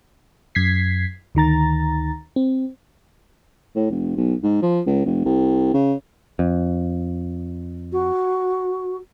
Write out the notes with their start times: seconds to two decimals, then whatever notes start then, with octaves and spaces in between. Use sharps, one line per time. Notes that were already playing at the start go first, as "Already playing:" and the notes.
0.55 F#2 G#6 B6 C7
1.35 D2 D#3 A#5 A6
2.36 C4
3.75 A2
3.91 F1
4.17 B1
4.43 G#2
4.62 F3
4.87 C#2
5.05 F1
5.25 C2
5.74 C#3
6.39 F2
7.92 F#4